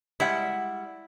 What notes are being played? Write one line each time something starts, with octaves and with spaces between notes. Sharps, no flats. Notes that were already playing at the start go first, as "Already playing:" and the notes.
G3 G#3 E4 F#5